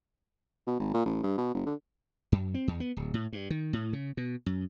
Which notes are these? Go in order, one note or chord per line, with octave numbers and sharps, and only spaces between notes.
B2
G#1
A#2
A1
G2
B2
F#1
D3
F#2
C4
E2
B3
D1
A2
G2
D#3
A2
C#3
B2
F#2